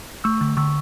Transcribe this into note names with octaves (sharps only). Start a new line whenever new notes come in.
A3 C#6 E6
D3
D3 C#6 E6